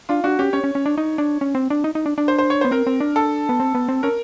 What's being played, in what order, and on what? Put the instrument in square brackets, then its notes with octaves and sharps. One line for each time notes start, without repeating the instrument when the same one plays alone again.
[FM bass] D4 [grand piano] F4
[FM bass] D4 [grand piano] F#4
[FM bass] C#4 [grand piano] G4
[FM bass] C#4 [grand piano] C#5
[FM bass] C#4
C#4
D4
D#4
D4
C#4
C4
D4
D#4
D#4
D4
D4
[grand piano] C5
C5
C#5
[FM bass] B3 [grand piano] C5
[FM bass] C4 [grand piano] A#4
[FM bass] C4
D4
[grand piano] A4
[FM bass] B3
C4
B3
C4
[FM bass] C#4 [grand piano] A#4